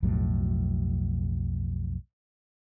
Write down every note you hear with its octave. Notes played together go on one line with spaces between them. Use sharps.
B1 F2 A2 F#3